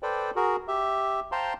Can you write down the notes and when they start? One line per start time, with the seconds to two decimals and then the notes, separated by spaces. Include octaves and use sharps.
0.03 A4 B4 C5 D5 G5
0.36 F#4 G#4 A#4
0.68 G4 E5
1.32 C5 F5 G5 A5 A#5 C6